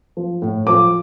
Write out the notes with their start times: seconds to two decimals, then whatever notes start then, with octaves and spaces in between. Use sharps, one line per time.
0.17 F3
0.42 A2
0.67 F3 D6